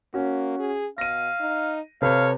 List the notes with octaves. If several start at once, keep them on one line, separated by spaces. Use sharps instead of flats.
A#3 C#4 F#4
G#4
B2 F5 A#6 D#7
D#4
C3 A4 B4 C#5 F5